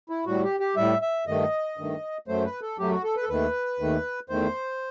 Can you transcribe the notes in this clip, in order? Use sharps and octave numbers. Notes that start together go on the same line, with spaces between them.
E4
A2 G3 F#4
G4
G4
A2 G3 E5
E5
G2 D#3 A3 D#5
G2 D#3 A3
F#2 F#3 A3 C5
B4
A4
F#2 F#3 A3 G4
F#4
A4
B4
A4
D#2 D#3 A3 B4
D#2 D#3 A3
E2 D#3 A3 C5